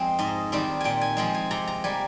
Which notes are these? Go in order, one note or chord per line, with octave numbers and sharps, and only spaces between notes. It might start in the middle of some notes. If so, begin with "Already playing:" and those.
Already playing: F2 F3 G#3 C4
G#2 D#5
D#3 G3 C4
A#2 G5 G#5
G#5
F3 G#3 C4 A#5
G#5
C3 A#5
A#5
G3 A#3 G#5